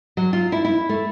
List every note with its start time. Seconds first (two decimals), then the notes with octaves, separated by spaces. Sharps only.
0.17 F#3
0.33 F4
0.52 E4
0.65 E4
0.89 A3